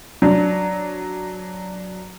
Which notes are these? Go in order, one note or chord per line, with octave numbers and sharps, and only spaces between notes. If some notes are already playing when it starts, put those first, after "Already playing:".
F#3 D4